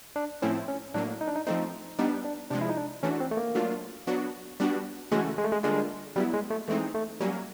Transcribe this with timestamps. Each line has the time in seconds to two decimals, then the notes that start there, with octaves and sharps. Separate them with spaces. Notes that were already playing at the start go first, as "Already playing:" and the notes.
0.16 D4
0.42 A2 F3 A3 C4 C#4 E4
0.68 C#4
0.94 A2 F#3 A#3 D4
1.21 D#4
1.28 D4
1.36 D#4
1.47 F3 A3 C4 D#4
1.99 G3 B3 D4 D#4
2.24 D4
2.50 C3 F3 G#3 D4
2.61 E4
2.69 D#4
2.77 D4
3.03 E3 A3 C#4 D4 F#4
3.20 C4
3.31 A3
3.37 A#3
3.55 F#3 A3 D4 F4
4.07 F#3 B3 D4 F#4
4.60 G3 B3 D4 F#4
5.11 C#3 E3 G#3 A3 C#4 F#4
5.38 G#3
5.44 A3
5.52 G#3
5.63 D3 G3 G#3 A#3 D4 F4
6.16 F#3 G3 B3 E4
6.34 G#3
6.51 A3
6.68 E3 G#3 A3 C4 D#4
6.94 A3
7.21 F#3 G3 A#3 C#4